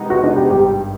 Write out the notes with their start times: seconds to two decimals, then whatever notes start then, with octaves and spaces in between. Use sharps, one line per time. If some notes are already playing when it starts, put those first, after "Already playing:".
Already playing: C3 D#3 G#3 B3 D#4
0.10 F#4
0.24 D4
0.36 G4
0.51 G#1 G2 D#3 G4